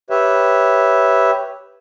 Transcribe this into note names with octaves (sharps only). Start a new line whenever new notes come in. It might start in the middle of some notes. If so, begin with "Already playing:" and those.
G4 B4 C#5 E5